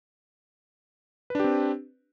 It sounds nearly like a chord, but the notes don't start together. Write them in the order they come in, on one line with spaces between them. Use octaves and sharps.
B4 D4 G4 C4